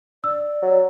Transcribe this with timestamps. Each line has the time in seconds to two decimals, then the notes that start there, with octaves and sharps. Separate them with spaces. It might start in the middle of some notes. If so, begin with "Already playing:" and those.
0.24 D5 E6
0.62 F#3